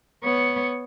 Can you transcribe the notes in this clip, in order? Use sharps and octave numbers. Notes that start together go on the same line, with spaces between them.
B3 C#5